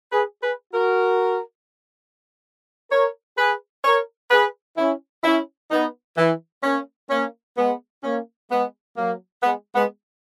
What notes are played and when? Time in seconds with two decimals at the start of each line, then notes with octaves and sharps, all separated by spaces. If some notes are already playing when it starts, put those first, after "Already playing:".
0.12 G#4 B4
0.42 G#4 B4
0.73 F#4 A#4
2.91 A#4 C#5
3.38 G#4 B4
3.84 A#4 C#5
4.30 G#4 B4
4.77 C#4 E4
5.24 C#4 E4
5.71 B3 D#4
6.17 E3
6.63 A#3 C#4
7.10 A#3 C#4
7.57 G#3 B3
8.03 A#3 C#4
8.50 G#3 B3
8.97 F#3 A#3
9.43 G#3 B3
9.74 G#3 B3